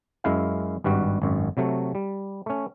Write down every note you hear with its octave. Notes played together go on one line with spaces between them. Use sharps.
F#2 G#3 E4 F5
G#1 G2 G3 F#4
G#1 F#2
C3 F#3 A3
G3
A3 C#4